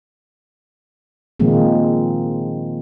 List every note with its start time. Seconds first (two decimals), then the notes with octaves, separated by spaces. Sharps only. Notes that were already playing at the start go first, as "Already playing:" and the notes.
1.40 A#2 D#3 F3 G#3 A#3 C4